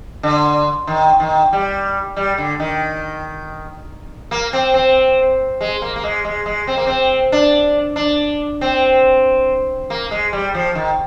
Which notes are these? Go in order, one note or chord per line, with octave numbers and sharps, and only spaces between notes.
D3
D#3
D#3
G3
G3
D3
D#3
A#3
C4
C4
G#3
A#3
A#3
G#3
G#3
G#3
C4
A#3
C4
D4
D4
C4
A#3
G#3
G3
F3
D#3